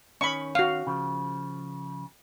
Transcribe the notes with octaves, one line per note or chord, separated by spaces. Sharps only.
D#3 C#4 B5 C#6
F#4 F5
C#3 F3